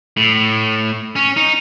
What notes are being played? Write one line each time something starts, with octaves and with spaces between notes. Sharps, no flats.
A2
C#4
D#4